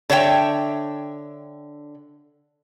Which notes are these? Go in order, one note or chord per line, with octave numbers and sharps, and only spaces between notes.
D3 C#5 E5 G5